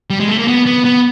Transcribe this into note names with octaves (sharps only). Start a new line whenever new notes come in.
G3
G#3
A3
A#3
B3
B3
B3